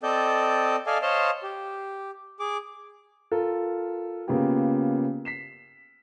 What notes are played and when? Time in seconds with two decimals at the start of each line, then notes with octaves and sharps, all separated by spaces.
0.03 C4 A4 D5 D#5 G6
0.87 A4 D5 D#5 F5 G#5
1.02 C5 C#5 D#5 F5 A5 C6
1.43 G4
2.40 G#4 D6
3.31 F4 A4 A#4
4.27 C#3 A#3 B3 F4 G4 B4
5.25 B6 C7 E7